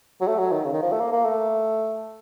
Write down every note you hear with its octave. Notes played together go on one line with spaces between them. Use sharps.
F#3
A3
F#3
D#3
C#3
D#3
F3
A3
A#3
A#3
A3